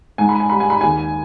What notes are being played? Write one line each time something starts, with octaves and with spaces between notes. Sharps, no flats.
G#2 G#5
B5
G#5
G3 B5
G#5
B5
D#2 G#5